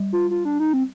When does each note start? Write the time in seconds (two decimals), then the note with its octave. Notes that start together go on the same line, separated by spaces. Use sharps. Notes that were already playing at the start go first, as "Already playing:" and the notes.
Already playing: G3
0.13 F4
0.31 F4
0.45 D4
0.60 D#4
0.73 C4